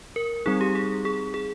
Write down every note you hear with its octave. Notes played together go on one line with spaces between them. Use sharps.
A#4
G3 C4 D#4 G#4
G4
G#4
G#4
G#4